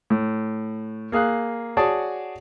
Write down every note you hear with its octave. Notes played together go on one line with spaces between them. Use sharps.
A2
A#3 G#4 F5 F#6
F#4 G#4 C#5 D5 A5